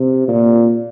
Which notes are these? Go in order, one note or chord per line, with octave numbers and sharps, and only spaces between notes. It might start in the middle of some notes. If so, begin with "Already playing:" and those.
Already playing: C3
A#2